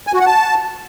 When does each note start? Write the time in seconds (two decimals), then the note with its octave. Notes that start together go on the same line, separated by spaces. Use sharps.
0.07 G#5
0.13 F#4
0.20 F#5
0.26 A5